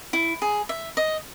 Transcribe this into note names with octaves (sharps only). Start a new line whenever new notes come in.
E4
G#4
E5
D#5